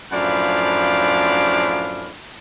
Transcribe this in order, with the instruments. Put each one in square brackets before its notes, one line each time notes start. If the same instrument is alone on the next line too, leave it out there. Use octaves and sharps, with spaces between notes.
[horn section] F#2 A2 F3 D4 F5 B5